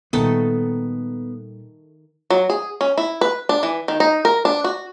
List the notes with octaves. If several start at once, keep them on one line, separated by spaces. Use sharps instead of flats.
A#2 D#3 G3 A3 B3 A4
F#3
G#4
C#4
E4
B4
D4
E3
D#3
D#4
A#4
D4
F#4